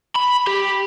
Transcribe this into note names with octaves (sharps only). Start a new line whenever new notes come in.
B5
G4